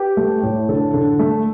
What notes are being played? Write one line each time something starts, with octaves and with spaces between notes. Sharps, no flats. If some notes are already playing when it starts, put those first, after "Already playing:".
Already playing: G4 B4
A3
A2
D3 A4
D3
A3